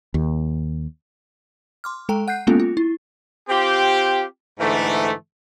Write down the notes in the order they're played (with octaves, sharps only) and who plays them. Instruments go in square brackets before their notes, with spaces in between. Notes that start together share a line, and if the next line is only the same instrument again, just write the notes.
[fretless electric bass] D#2
[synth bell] C6 D6 F6
G#3 A4 G5 A#5
F#5 F#6 G6 C7
G#3 A#3 B3 C#4 F4 A4
F4
E4
[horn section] C4 F4 G4
G#2 D3 E3 A3